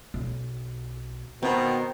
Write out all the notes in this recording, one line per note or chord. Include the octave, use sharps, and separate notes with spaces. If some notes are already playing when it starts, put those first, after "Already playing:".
B1
B2 D#3 C4